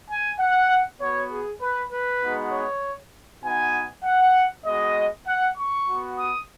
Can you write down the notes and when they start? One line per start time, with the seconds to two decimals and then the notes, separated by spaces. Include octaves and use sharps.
0.09 G#5
0.39 F#5
1.00 B3 F#4 C#5
1.30 G#4
1.61 B4
1.92 B4
2.22 G#3 B3 D#4 F#4
2.52 C#5
3.43 B3 D#4 F#4 G#5
4.04 F#5
4.65 G#3 B3 F#4 D#5
5.26 F#5
5.57 C#6
5.87 B3 F#4
6.18 D#6